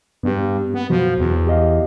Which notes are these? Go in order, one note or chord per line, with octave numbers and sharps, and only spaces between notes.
G2 B3 G4
B3
F#2 B2 F3 F#4
E2
G4 D#5 F5